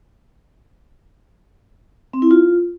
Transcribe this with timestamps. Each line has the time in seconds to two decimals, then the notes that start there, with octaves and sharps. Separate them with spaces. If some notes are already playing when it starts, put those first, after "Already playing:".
2.13 C4
2.22 E4
2.31 F4